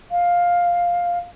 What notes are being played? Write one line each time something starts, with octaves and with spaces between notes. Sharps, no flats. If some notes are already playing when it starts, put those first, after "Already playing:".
F5